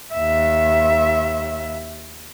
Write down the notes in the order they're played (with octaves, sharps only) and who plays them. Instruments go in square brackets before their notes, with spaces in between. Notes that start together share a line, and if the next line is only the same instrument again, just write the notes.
[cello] D#2 E5